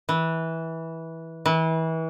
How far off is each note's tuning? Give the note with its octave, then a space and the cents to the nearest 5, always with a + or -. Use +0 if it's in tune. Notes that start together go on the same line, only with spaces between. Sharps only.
E3 -15
E3 -30